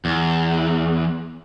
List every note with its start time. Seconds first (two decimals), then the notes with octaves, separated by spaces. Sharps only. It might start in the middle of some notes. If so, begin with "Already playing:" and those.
0.05 E2